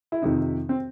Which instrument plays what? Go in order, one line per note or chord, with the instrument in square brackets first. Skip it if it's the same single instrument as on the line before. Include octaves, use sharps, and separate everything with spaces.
[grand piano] E4
F2 C3 D#3 D#4
C4